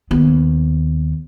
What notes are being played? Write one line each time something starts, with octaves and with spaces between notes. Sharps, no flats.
D#2 B3